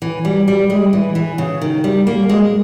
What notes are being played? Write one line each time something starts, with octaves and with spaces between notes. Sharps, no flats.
E3
G3
G3
G#3
E3
E3
C#3
D#3
G3
A#3
G#3